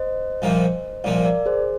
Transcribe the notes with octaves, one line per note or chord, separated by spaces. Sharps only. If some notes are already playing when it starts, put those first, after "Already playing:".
Already playing: C5 D#5
C2 A#2 F3 A#3
C2 A#2 F3 A#3 D5 F5
A#4 D5
G#4 C5